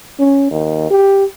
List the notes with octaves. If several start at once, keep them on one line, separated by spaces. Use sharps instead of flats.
C#4
D#2
G4